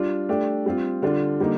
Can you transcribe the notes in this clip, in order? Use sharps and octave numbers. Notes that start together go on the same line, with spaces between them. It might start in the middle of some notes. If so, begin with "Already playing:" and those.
Already playing: G3 D4 F4
A3 D4 G4
G3 C4 F4
D3 G3 D4 F4
D3 G3 A#3 D#4